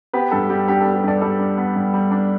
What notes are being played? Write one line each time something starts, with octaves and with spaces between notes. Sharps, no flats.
B3 G4 B4
G2 A4
G3 G4
D4 G4
A4
B3
G4 B4
G2 A4 D5
G3 A4 D5
D4
B3
G2
G3
D4